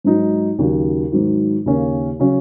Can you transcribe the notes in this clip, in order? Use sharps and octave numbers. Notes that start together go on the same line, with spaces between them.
G#2 F#3 D#4
D#2 C#3 F#3
G#2 D#3 F#3
D#2 C#3 A#3 C#4
C#3 F#3 C#4